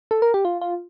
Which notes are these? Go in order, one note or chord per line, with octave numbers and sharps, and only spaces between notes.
A4
A#4
G4
F4
F4